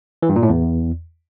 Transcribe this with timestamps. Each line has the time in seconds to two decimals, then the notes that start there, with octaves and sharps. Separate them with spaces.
0.23 E3
0.29 G2
0.36 A#2
0.43 A2
0.49 E2